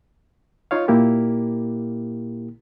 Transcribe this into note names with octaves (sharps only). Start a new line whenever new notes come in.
D#4 F4 C#5 F5
A#2 A#3 E4 G4 A#4